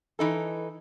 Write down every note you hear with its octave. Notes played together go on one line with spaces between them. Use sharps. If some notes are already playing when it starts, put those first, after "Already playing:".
E3 D#4 A4